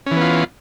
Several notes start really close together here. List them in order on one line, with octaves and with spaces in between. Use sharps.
C#4 E3 B3 F4